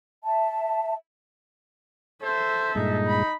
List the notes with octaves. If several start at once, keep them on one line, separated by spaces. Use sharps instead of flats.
E5 A5
A4 C5 E5
G2 A#2 G#3 D#4
B5